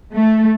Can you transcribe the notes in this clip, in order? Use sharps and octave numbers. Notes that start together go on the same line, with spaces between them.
A3